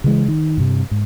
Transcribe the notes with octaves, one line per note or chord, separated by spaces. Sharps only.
C#3 E3 G#3
D#3
G2 C3
G#2